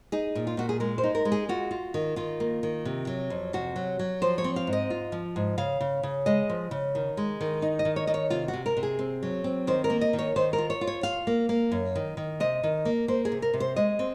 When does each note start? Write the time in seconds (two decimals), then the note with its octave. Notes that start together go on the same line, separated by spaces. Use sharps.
0.12 D#4 G#4
0.35 A#2
0.47 F4
0.57 A#2 F#4
0.69 G#4
0.80 G#3 A#4
0.98 C5
1.04 D#4
1.15 A#4
1.25 G#3
1.32 G#4
1.49 F4 F#4
1.71 F4
1.94 D#3
2.16 D#3 F4
2.40 A#3
2.63 D#3
2.85 C3
3.07 F#3
3.30 F2
3.53 C3 F#4
3.76 F#3
3.99 F#3
4.22 F3 C5
4.38 C#5
4.44 C4
4.56 F5
4.67 G#2
4.73 D#5
4.90 F4
5.12 F3
5.36 G#2
5.58 C#3 F5
5.81 C#3
6.03 C#3
6.26 G#3 D#5
6.50 F3
6.71 C#3
6.95 D#3
7.17 G#3
7.41 D#3
7.62 D#4
7.79 D#5
7.85 D#3
7.96 C#5
8.07 D#3 D#5
8.14 C#5
8.30 C3 F4
8.48 F#4
8.53 C3
8.66 A#4
8.77 C3
8.83 G#4
8.99 C4
9.23 F#3
9.44 C4
9.67 D#3 C5
9.84 A#4
9.90 A#3
10.01 D#5
10.13 D#3
10.19 C#5
10.36 D#3 C5
10.53 A#4
10.58 F4
10.70 C#5
10.81 F4
10.87 C#5
11.03 F4 F5
11.27 A#3
11.49 A#3
11.72 F#2
11.95 D#3
12.17 D#3
12.40 C3 D#5
12.63 D#3
12.85 A#3
13.08 A#3 C5
13.25 G#4
13.32 C3
13.42 A#4
13.54 C3
13.60 C5
13.76 G#3 D#5
13.99 C4